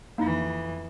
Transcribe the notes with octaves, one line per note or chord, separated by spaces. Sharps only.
F2 E3 A#3 D#4 E4